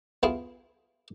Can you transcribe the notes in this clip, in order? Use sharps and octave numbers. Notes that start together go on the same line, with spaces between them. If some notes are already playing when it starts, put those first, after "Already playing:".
B3 E4 F4 G#4